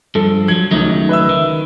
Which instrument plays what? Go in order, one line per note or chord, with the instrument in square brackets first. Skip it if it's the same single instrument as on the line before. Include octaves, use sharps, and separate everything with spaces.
[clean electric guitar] G2 F3 [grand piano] A4
[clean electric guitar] F3 F#3 [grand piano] G#6
[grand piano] C#2 D#4 [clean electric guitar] D#3 F#3 A3
[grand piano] B4 E5 E6
[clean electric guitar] D#3